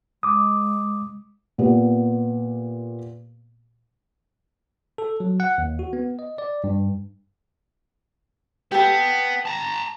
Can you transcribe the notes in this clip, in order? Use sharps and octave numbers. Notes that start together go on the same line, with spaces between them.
G#3 D6 D#6
A#2 B3 G4
A4
F#3
F#5
D#2
F#4
B3
D#5
D5
G2
B3 G4 A4
A5 A#5